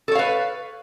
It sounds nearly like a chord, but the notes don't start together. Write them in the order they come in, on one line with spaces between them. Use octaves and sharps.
A4 C#5 F5 B4